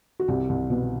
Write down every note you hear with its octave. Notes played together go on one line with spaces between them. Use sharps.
F#4
C2 G4
C2
B2